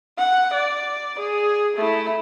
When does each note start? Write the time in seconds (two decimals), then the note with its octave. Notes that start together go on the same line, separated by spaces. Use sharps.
0.18 F#5
0.54 D5
1.19 G#4
1.76 A3 E4